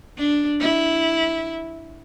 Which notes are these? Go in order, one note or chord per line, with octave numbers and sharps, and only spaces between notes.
D4
E4